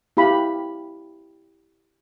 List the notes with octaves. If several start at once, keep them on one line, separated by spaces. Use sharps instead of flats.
E4 G4 F5 B5